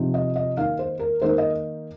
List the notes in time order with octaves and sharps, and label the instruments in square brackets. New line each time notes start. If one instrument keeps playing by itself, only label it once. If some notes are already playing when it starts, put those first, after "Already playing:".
Already playing: [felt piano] C3 F3 D#4
D#5
D#5
D#3 A#3 D#4 F5
C5
A#4
D#3 A#3 D#4 C5
D#5